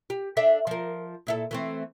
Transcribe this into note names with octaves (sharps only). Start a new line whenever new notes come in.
G4
D4 A4 E5
F3 A#4
A#2 E4 A4
E3 A3 C4